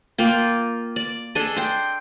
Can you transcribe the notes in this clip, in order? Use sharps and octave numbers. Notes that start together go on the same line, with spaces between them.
A#3 F4 G5
D5
D4 G#4 A4 D#5
G5 C6